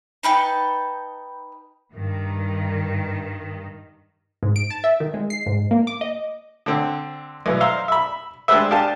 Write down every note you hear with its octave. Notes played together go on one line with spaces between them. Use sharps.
D#4 B4 G5 A5
G2 D#3
G#2
D7
A5
E5
D#3
G#3
C7
G#2
A#3
D6
D#5
D3 C4
B1 E3
C5 E5 F5 A#5 C6
E5 B5
G#3 D4 G4 B4 C5 E5
D4 G4 F5 G#5 A5